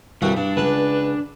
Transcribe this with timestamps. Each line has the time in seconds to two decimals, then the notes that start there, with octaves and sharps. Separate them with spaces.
0.22 C2 G2 G3 F#4
0.37 G2 D4
0.57 C#2 B4 A5